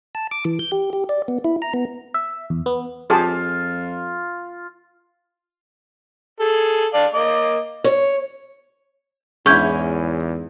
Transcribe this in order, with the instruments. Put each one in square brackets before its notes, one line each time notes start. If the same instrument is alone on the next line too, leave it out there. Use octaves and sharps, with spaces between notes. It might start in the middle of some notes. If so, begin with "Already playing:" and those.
[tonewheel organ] A5
D6
E3
G6
G4
G4
D5
B3
E4
A#5
B3
[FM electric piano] E5
E2
B3
[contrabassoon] F2 [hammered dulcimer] F4 [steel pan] G4 G#4 A5
[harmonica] G#4 A4
D5 F5 A5
A#3 D#5 D6
[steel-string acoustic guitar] C#5
[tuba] E2 [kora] G#2 [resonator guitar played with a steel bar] C#4 E4 [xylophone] C#6 G6 G#6